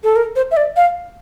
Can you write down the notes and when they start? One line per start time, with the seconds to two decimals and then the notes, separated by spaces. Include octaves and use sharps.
0.04 A4
0.16 A#4
0.36 C5
0.51 E5
0.57 D5
0.76 F5